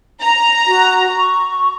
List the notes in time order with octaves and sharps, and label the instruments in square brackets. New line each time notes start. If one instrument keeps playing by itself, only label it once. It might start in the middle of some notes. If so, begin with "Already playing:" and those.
[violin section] A#5
[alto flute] F#4
C#6